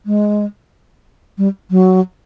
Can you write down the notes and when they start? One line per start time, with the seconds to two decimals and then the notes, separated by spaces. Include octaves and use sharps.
0.06 G#3
1.38 G3
1.70 F#3